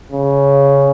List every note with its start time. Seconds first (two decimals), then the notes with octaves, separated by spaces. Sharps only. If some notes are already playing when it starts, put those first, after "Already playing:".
0.12 C#3